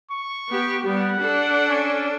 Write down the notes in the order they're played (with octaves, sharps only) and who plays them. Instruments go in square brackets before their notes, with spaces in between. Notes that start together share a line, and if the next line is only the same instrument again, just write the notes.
[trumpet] C#6
[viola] B3 G4
[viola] G3 B3 [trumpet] F#5
[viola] D4 A4
[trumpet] C#4